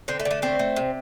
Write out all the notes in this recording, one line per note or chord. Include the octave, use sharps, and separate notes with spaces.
D3 C4
A3
D3
A3
A3 C4
A3
C3